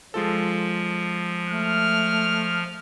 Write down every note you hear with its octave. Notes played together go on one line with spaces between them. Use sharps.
F3 G#3 F4 A4
A3 F6